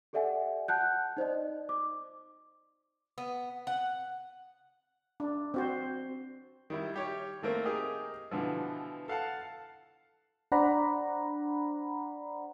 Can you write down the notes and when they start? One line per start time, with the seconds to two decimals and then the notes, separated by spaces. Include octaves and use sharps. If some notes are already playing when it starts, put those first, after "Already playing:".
0.13 G4 A4 D5 E5 F#5 G#5
0.68 F#5 A5 F#6 G6
1.17 D#4 C5 D5 D#5
1.69 D6
3.18 B3
3.67 F#5
5.20 D4
5.54 C4 F#4 C5
6.70 D#3 G3 E4
6.94 G3 G4 C#5
7.42 D#3 A3 A#3 C4
7.65 D#4 G4 G#4 A#4
8.31 B2 D3 E3 F3
9.08 A4 F5 F#5 A5
10.52 D4 C5 D5 F#5 A#5 B5